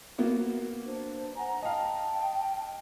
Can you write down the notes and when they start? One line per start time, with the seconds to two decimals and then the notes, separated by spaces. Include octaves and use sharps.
0.18 A#3 B3 F#4
0.85 D4 C5
1.36 F#5 G#5 A#5
1.62 D#5 F5 G5 A5